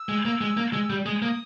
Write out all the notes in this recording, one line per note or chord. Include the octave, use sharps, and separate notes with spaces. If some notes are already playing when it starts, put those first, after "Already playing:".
Already playing: E6
G#3
A#3
G#3
A#3
G#3
G3
G#3 D#6
A#3